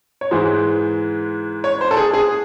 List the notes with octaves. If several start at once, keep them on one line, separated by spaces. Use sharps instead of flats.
C#5
G#2 E3 G#3 C5
C#5
C5
A4
G#4
G#4